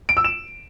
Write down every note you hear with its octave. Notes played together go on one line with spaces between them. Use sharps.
D7
E6
E7